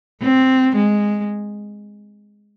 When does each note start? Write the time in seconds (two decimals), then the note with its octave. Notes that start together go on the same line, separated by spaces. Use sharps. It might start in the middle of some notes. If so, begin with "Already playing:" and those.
0.22 C4
0.76 G#3